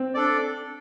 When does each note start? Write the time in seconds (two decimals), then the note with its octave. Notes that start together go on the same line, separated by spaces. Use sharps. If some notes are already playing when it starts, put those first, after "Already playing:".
Already playing: C4
0.14 D4 A4 D5